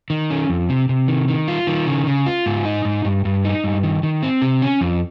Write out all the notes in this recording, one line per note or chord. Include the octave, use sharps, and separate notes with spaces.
D#3
C#4
F2
C3
C3
D#3
D#3
F4
D#3
C#3
C#3
F4
G#2
D#4
G#2
G2
G2
D#4
G2
D#3
D#3
C4
C3
C#4
F2